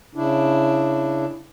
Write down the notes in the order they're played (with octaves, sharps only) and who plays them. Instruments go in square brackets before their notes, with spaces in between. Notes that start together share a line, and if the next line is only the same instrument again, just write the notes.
[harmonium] C#3 D4 E4